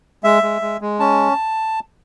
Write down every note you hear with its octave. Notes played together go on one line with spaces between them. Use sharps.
G#3 E5
G#3
G#3
G#3
C#4 A5